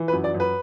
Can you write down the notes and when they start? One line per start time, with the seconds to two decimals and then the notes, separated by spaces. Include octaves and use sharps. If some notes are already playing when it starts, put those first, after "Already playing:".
Already playing: E3
0.08 B4
0.13 F#2
0.24 D5
0.34 F#2
0.40 B4